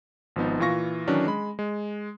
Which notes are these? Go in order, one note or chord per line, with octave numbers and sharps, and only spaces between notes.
G#1 F3 B3 D#4
A#2 E3 F4 C#6 A#6
D#3 E3 F#3 C#4 D4
G#3 B5
G#3